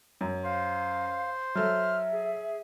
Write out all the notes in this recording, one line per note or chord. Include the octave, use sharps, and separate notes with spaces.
F#2
C5 F5
F#3 A4 E5 F6
G#4